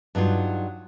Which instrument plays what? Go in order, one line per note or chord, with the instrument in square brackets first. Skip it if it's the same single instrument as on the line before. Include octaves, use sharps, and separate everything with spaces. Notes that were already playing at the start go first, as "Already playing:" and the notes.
[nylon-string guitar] G2 F#3 D#4 F4